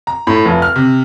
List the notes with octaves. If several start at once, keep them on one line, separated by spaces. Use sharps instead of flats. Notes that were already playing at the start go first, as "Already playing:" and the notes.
A#5
A2
F1
F6
C3